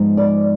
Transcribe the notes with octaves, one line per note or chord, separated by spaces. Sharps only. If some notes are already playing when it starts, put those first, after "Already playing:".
Already playing: G#2 F3 G#3 B3 D#4
D5